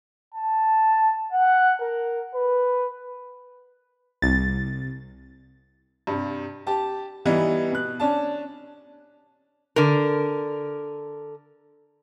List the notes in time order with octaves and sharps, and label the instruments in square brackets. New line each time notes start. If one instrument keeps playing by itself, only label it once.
[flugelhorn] A5
F#5
A#4
B4
[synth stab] C2 A6
[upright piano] G2 C3
G4 A5
E3 G3 B3 D#4 E4
B2 F#6
C#4 D4 A5
[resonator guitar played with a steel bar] D3 A#4